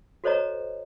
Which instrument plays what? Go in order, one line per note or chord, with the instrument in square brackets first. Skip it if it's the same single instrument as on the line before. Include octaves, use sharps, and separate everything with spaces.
[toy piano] F#4 A4 C5 C#5 D#5 A#5